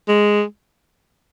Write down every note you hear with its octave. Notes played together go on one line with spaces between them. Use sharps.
G#3